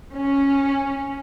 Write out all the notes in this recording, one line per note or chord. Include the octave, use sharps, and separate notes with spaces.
C#4